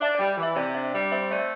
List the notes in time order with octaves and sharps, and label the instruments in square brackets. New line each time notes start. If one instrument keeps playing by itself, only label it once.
[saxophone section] D4 [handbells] E5
[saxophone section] G3 [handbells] D5
[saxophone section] E3 [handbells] E5
[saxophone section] C3 [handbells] D5
[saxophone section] D4 [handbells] E5
[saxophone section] G3 [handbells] E5
[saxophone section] C4 [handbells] E5
[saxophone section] A3 [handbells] D5
[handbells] E5